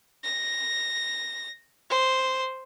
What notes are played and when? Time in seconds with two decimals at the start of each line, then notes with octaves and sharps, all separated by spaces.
0.24 A#6
1.90 C5